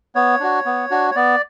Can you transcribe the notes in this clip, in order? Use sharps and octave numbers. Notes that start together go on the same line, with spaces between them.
B3 C#5
D4 F#4
B3
D4 F#4
C#5
B3 D5